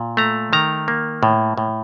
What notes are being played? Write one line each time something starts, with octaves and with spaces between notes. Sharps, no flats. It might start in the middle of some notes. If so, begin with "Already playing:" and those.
Already playing: A#2
A3 A#5
D#3 A#5
A#3
A2
A2